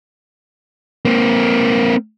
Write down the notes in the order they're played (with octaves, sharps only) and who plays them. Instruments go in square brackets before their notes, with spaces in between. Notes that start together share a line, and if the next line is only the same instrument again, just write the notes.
[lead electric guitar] A#3 C4